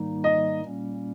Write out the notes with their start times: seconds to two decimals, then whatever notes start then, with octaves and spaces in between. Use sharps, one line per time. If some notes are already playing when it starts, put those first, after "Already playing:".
Already playing: G#2 D#3 G3 A#3 D#4
0.24 D#5
0.62 A#2 G3 A#3 C#4